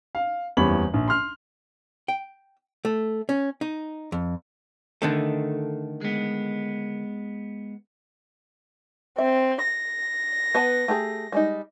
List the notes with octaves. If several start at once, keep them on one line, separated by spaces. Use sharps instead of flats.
F5
F#1 E2 G3 C#5 B5 F#7
A#1
C6 F6
G5
A3
C#4
D#4
F2
D3 D#3 A3
G#3 B3
C4 E5
A#6
B3 B4 A5
A3 G4 G#4
G3 G#3 D#4